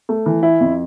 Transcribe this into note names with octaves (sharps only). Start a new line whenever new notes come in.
A3
E3
E4
F2